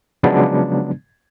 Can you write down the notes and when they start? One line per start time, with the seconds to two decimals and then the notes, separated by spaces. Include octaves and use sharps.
0.23 C#3 F3 F#3 G#3 B3 D4